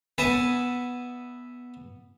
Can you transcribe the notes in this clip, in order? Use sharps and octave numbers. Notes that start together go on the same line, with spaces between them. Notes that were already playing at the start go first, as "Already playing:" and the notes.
B3 B4 E5 G#5 A5 D#6